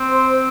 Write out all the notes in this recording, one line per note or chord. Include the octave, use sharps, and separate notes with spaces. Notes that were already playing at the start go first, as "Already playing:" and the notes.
Already playing: C4
C5